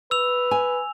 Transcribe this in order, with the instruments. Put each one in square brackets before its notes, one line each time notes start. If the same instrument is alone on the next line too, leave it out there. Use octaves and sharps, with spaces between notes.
[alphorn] B4 [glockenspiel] E6 F7
[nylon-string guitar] G#5